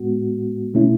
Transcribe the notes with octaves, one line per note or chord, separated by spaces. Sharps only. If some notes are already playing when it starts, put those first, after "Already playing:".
Already playing: A2 G#3 B3 F#4
B2 A3 C#4 E4